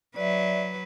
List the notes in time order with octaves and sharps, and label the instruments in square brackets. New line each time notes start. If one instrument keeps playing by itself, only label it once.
[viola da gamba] F#3 B4 [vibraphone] D5 E5